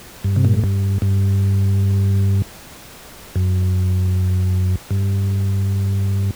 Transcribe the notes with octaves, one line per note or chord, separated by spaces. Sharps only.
G2
C3
A#2
A2
G2
G2
F#2
G2